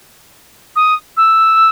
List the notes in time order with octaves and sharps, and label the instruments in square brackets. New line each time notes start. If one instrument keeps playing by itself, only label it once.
[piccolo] D#6
E6